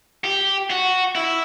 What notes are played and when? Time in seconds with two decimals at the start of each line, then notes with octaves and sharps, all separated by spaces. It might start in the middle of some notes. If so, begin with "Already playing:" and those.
0.24 G4
0.70 F#4
1.15 E4